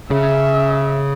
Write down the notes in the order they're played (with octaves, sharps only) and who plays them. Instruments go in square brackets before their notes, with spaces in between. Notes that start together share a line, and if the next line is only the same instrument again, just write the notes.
[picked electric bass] C#3 [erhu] E5